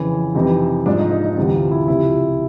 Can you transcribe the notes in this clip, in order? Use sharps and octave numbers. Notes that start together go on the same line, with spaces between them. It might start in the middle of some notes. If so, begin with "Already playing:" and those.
Already playing: F2 C#3 E3
F2 C3 E3 D#4
G#2 F3 D4
D#4
D#4
D#4
D2 C3 E3 D#4
F4
E4
C#2 C3 F3 E4